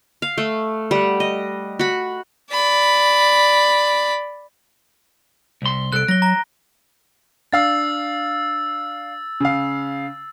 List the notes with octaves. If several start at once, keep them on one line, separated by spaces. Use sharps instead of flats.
F5
A3
G3 F#5
D#5
F#4 B5
D5 B5
C2 C6
C2 A4 F#6 D7
F#3 A#6 G7
A#5 A#6
D4 F5 E6 A6
C#3 F5